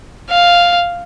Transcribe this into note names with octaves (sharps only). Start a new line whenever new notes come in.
F5